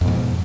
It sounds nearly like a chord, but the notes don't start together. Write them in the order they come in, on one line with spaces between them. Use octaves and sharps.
F2 B2 G#2